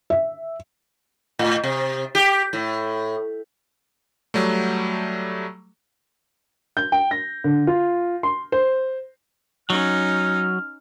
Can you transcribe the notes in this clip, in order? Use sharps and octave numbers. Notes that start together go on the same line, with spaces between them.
E5
A2
C3
G4
A2
F#3 G3 A3
G6
G5
A#6
D3
F4
C6
C5
F#3 C#4 D#4 F6